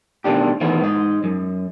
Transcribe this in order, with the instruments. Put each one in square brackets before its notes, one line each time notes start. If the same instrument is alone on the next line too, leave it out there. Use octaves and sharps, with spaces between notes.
[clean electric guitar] B2 D#3 A3 D4 G4
D#3 E3 A3 B3
G#2 D#4
F#2